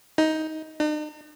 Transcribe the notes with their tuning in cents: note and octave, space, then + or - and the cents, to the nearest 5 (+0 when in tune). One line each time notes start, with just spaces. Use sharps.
D#4 +15
D#4 -45